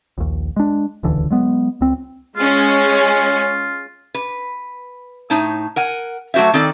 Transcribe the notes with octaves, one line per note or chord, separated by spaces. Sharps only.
A#1 D#2
G#3 D4
D#1 C#2 D3 E3
F#3 G#3 B3
C#2 C4
G#3 C#4 F4
B4
A2 D#4 C#5 A5
A#4 F#5 G#5
F#3 A3 F#4 C5 E5
D#3 C4 A4 D5